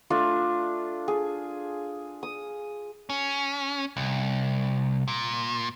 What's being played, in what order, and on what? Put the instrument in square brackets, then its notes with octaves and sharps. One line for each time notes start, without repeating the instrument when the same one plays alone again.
[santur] A3 D4 F4
G#4
D#6
[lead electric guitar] C#4
C2
A#2